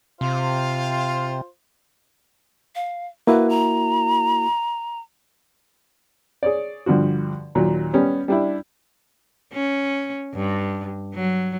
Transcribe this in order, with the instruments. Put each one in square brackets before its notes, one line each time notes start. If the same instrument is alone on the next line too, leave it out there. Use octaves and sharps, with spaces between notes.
[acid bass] C3 [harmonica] F4 C5 F5
[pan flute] F5
[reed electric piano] A#3 E4 F#4 [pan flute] B4
[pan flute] A#5
[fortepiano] G#4 C#5 D5
G2 D3 F3 F#4
D#2 A#2 F#3
G3 B3 C#4
G3 D4 E4
[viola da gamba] C#4
G2
F#3